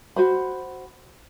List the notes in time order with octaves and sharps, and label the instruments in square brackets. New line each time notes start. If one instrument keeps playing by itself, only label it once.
[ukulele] F#4 C5 B5